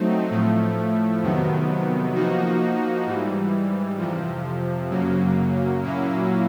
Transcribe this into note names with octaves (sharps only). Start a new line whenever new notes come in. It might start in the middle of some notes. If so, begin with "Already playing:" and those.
Already playing: F#3 A3 C4 D#4
A2 F3 A3
F2 C3 D#3 F#3 B3
F3 A#3 D#4 F#4
G#2 E3 G3
F2 C3 F3
F#2 C#3 F#3 A#3
A#2 F#3 A#3 C#4 E4